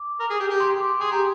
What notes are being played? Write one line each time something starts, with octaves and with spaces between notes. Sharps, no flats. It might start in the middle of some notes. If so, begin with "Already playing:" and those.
Already playing: D6
A#4
G#4
G4
G4
C6
D6
G#4 C6
G4 A#5